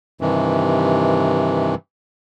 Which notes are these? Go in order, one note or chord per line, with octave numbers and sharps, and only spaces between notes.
G2 C3 D#3 E3